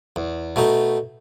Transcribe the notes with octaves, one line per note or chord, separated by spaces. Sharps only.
E2
B2 A3 D#4